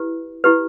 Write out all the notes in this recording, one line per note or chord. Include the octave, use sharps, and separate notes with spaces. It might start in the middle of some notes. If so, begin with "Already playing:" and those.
Already playing: E4 G4 B4
E4 G4 B4